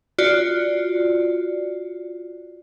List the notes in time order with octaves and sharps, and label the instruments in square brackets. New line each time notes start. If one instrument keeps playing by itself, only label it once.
[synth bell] F4 F#4 D5